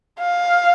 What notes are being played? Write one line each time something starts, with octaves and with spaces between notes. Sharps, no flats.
F5